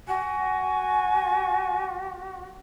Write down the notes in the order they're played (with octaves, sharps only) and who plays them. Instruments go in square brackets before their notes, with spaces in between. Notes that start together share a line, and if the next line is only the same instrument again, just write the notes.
[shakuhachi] F#4 [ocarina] G#5